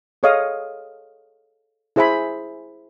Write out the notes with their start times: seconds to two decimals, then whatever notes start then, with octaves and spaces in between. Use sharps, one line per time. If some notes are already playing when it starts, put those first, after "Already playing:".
0.23 G#4 A4 C#5 D#5 F5 D#6
1.96 E4 G#4 C5 E5 G#5 B5